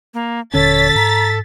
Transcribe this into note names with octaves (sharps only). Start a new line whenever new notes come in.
A#3
D#1 D3 C#4 A4 C#5 A6 B6
G#2 A#5